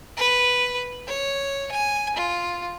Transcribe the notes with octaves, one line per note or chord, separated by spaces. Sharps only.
B4
C#5
G#5
F4